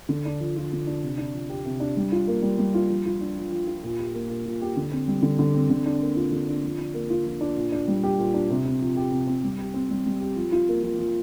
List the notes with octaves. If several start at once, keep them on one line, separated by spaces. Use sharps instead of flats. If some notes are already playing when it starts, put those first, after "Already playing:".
D3
D4
F3
F4
D3
D4
C3
D4
F3
G4
C3
D4
G3
F4
A#3
G3
G3
F4
F3
F4
D4
F3
F3
F4
A#2
G4
A#3
A#2
A#2
G4
D3
C4
G3
D3
D3
C4
D3
D4
A#3
F4
D3
D4
F3
D4
A#3
F4
F3
D4
A#2
D4
G3
G4
A#2
D4
C3
C4
F3
G4
C3
C4
G3
G4
C4
G3
G3
G4
F3
F4
A#3
F3
F3